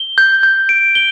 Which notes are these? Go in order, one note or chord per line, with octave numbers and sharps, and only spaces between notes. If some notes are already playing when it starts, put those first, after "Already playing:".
Already playing: G7
G6
G6
D7
G7